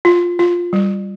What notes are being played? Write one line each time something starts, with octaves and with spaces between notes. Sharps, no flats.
F4
F4
G3